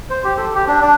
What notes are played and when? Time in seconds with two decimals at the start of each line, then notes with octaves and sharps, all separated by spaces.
0.10 C5
0.24 G4
0.37 A4
0.55 G4
0.67 D4
0.81 D4